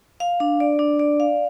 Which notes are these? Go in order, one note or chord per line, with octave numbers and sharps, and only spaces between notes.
F5
D4
D5
D4
D5
F5